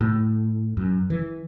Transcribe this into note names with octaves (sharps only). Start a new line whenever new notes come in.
A2
F#2
E3